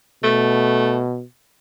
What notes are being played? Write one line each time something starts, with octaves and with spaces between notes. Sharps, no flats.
B2 A3